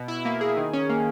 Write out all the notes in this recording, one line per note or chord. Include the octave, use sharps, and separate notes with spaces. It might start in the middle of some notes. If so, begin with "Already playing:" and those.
Already playing: B2
E4
A#3
G#4
D#3
C#4
A#3